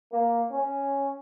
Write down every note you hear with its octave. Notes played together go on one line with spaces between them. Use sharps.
A#3
C#4